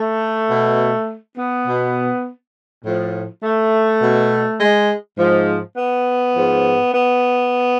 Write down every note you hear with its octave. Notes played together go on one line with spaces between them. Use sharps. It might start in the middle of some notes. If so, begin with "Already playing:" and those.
Already playing: A3
B2
B3
B2
A2 F3
A3
B2
G#3
G#2 F3
B3
G#2 F3
B3